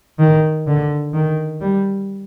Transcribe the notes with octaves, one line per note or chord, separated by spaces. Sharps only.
D#3
D3
D#3
G3